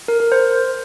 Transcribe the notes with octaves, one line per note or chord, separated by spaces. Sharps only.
A#4
A#4
C5